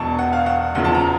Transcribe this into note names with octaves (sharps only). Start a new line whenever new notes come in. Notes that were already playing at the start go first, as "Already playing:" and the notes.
Already playing: E1 E2 B2 A5 C#6
F#5
F5
F#5
F#1 E2 C#3 F3 F#5
A5
A#5